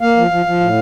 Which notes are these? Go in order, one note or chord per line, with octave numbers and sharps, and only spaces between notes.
A#3 F5
F3
F3
F3
A2